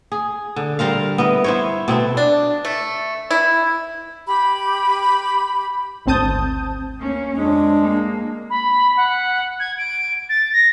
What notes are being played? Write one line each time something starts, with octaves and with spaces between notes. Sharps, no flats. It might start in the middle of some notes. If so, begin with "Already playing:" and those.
G#4
D3
G3 A#4 C5 F5
B3 E4 D#5
E4 C5 C#5
B2 C4 E4 A4
D4
A3
E4
G4 B5
G#1 D2 C4 A5 D#6 G6
A#3 C#4
F2 G#3 D4
A#3
B5
F#5
G#6
D7
A6
A#6